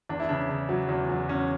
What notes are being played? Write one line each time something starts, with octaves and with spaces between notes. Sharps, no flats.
E2 D4
E4
C#3 D4
C#3
F#3
E2
F#3
E2 C#4